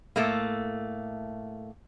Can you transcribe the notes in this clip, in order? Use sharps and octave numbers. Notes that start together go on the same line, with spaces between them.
A2 A3 A#3